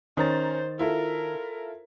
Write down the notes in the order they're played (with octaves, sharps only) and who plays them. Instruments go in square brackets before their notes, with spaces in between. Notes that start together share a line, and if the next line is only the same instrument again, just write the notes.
[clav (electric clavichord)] D#3 [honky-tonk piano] C#4 A#5 A6 [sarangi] C5
[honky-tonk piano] E4 F4 A4 [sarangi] A#4